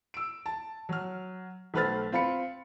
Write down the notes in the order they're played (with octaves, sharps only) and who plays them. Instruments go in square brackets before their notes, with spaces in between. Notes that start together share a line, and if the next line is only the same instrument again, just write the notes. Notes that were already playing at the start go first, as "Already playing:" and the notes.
[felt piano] E6 D7
A5
F#3 F6
B1 A3 B4 C5 F6 A6
C4 F4 B5 C#7